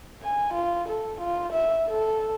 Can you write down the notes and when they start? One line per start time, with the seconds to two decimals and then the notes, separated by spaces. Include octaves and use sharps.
0.22 G#5
0.54 F4
0.88 A4
1.21 F4
1.53 E5
1.88 A4